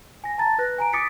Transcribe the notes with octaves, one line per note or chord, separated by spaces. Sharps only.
G#5 A#6
A5 A#5 A6
B4 F#6 A#6
G#5 A#5 D7
D6 D#6 A6 B6 C#7 D7